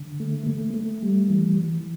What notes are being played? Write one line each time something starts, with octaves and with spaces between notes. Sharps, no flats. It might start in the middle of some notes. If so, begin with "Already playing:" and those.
Already playing: D3
A3
A3
A3
G3
E3
E3